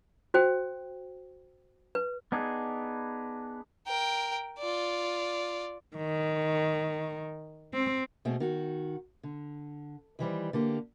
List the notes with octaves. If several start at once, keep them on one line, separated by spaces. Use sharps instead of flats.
F#4 C5 G5
B4
B3 D4 D#4 G#4
A#4 G5
F4 D5
D#3
C4
B2 A3 C4 G#4
D#3 F#4
D3
D#3 E3 G3 C5
D3 A#3 G4